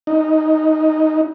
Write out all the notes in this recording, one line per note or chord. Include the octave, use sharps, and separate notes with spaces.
D#4